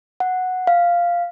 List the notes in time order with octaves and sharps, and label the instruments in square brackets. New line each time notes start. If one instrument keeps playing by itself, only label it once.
[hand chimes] F#5
F5